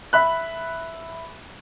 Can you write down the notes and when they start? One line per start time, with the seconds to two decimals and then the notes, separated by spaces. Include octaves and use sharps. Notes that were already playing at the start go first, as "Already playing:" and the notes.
0.13 E5 B5 F#6